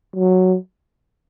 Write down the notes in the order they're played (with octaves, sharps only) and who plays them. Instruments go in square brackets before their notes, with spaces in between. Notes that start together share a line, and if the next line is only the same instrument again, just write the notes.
[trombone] F#3